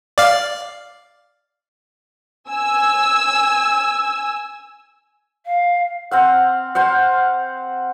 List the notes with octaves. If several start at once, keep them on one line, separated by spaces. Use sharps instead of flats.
D5 F5
G#5 E6
F5
C4 F5 F#5
C5 F5 F#5